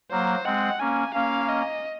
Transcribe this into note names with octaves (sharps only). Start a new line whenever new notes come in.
F#3 A#3 C5
G#3 C4 F#5
A#3 C#4 G#5
A#3 C#4 F5
D#5